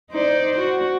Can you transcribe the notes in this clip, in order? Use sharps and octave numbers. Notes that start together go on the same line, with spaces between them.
D#4 C5 D5
F#4